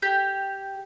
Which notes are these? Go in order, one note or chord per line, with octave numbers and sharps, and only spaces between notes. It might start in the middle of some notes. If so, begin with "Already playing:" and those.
G4